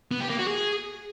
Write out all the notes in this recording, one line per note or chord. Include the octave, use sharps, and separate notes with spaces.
B3
G4
A#3
F#4
G#4